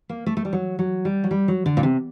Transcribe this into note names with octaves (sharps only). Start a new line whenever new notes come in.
A#3
A3
A3
G3
F#3
F#3
G3
F#3
G3
F#3
D3
A#2
C3